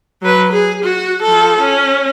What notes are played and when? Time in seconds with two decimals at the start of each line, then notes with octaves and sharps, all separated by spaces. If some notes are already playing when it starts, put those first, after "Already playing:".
0.22 F#3 B4
0.52 G#4
0.84 F#4
1.22 F3 A4
1.60 C#4